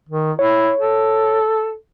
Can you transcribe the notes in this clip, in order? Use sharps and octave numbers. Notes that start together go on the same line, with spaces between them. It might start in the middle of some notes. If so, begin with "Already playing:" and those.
D#3
E4 C#5
A4